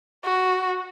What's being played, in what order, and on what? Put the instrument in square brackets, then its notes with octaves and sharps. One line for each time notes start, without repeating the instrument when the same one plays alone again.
[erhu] F#4